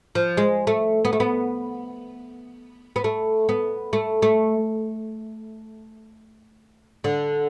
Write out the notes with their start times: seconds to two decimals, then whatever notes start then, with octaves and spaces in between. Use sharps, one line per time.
0.15 F3
0.37 G#3
0.67 A3
1.05 B3
1.13 A3
1.20 B3
2.96 B3
3.04 A3
3.49 B3
3.93 A3
4.22 A3
7.04 D3